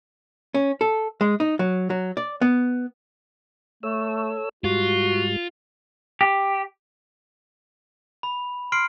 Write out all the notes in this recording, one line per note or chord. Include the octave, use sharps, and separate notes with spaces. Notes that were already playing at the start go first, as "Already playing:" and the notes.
C#4
A4
G#3
D#4
F#3
F#3
D5
B3
A3 A4 C#5 E6
G#2 G3 F4 F#4
G4
B5
C6 F6 C7 D7